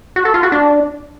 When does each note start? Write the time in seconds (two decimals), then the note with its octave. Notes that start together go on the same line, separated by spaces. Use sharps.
0.16 F#4
0.25 A4
0.34 F4
0.43 F#4
0.52 D4